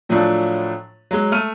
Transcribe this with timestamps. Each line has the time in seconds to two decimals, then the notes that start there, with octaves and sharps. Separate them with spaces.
0.09 A2 F3 F#3 A3 D4
1.11 F#3 G#3
1.32 A3 F6 D#7